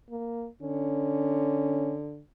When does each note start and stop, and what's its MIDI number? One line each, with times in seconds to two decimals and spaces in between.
0.10 0.48 58
0.62 2.21 50
0.62 1.96 61